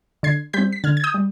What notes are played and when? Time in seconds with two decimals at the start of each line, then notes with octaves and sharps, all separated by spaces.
0.23 D3 G#6 C7
0.53 G3 C4 G6 B6
0.72 B6
0.84 D3 F6 G#6
0.97 G#6
1.03 D#6 G6
1.14 G3